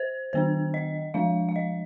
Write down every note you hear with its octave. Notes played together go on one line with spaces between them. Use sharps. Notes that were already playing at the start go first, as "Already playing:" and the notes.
Already playing: C5
D#3 B3 D4 C5
D#5
F3 G#3 D4 F5
F5
D#5